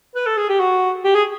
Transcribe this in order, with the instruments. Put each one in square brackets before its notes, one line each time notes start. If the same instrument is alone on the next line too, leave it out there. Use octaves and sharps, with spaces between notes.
[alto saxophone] B4
A4
G#4
G4
F#4
G4
G#4